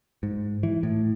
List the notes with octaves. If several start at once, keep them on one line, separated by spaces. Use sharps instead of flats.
G#2
E3
A2